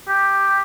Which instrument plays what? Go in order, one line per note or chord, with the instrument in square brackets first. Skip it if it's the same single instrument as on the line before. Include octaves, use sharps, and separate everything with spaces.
[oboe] G4